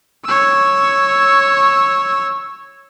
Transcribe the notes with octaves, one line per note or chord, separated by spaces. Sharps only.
C#5 E6